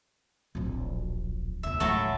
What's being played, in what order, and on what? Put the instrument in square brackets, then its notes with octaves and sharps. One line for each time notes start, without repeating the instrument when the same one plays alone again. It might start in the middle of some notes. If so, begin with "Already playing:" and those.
[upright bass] D1 A#1
[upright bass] E1 C#2 [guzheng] E5
[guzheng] A2 F#3 A3